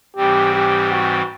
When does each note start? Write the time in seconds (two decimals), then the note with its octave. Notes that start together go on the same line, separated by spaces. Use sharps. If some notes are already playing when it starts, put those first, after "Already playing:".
0.16 G#2 E3 G3 C4 G4
0.55 G4
0.92 F#4